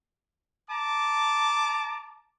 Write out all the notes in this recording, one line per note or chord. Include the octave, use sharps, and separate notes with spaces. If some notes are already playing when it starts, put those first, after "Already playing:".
A5 A#5 D6